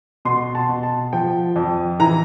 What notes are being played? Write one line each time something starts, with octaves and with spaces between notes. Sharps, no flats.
B2 C6
A5
B2
A5
F3 G5
F2
E3 A#5